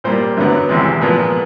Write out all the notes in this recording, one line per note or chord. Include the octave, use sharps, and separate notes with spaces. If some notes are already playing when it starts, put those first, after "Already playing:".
A#2 G3 A#3 C5
F#2 D3 F#3 B3
D2 C3 E3 G#3
A#2 F3 G#3 B3